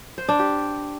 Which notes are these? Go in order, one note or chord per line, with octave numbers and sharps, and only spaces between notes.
C5
D4
G4